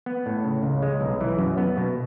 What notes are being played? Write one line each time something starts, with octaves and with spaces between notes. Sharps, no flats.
B3
A2
C#3
C#2
G#3
B1
E3
F#2
B3
B2